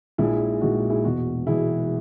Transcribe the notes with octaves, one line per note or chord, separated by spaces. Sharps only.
A#1 A#2 G#3 D#4 E4 G#4
A#1 A#2 G#3 D#4 F#4
F#4
E4 G#4
E1 E2 B2 F#4
E1 E2 B2 E4 G#4